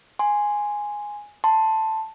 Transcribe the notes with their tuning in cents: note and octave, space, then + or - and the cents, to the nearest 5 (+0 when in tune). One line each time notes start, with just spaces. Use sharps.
G#5 +0 C6 +0
A5 +0 C6 +0